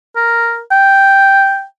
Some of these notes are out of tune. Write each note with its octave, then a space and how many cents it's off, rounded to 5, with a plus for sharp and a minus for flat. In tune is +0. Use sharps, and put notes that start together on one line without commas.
A#4 +0
G5 +0